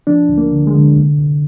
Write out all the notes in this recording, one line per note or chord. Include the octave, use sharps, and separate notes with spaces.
F3 D4
D2
A#3
D3
G#3
D3
C2
C2